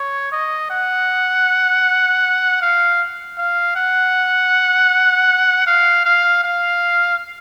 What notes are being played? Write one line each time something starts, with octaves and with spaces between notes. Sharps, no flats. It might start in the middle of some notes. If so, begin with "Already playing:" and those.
Already playing: C#5
D#5
F#5
F5
F5
F#5
F5
F5
F5